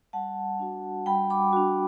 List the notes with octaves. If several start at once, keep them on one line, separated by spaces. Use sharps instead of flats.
G3 F#5 A5
D4 F#4
G3 G5 B5
B5 D6
D4 F#4